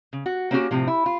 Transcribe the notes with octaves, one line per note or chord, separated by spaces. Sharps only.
C#3
F#4
A#3 C4 C#4 E4 F#4 G4
A2 C3 F3
E4
F4